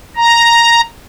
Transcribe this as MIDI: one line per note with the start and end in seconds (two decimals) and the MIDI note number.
0.16 0.81 82